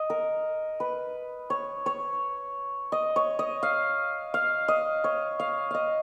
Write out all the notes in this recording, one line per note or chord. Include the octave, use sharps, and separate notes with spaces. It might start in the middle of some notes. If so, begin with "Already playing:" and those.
Already playing: D#5
A#4
B4
C#5
C#5
D#5
C#5
D#5
F5
F5
D#5
C#5
F5
D#5 F5